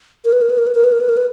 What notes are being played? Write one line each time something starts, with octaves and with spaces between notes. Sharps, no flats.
A#4
B4
A#4
B4
A#4
B4
A#4
B4
A#4
B4
A#4
B4